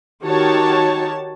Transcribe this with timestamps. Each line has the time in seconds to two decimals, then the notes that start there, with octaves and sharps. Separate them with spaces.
0.24 D#3 F#4 G4 C#5 A5